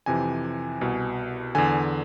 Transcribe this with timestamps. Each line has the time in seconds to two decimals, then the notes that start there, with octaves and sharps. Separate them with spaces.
0.06 F2 C3 E3 G#5
0.81 C2 B2
1.55 E2 D3 G#5